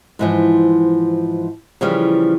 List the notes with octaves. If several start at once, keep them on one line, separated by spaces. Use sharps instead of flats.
G#2 E3 F3
C#3 E3 F3 G3